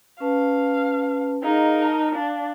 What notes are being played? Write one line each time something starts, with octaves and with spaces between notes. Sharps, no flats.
C#4 B4 F5 A5
D#4 G#4 A#4 D#5 F5
A5
D4 F5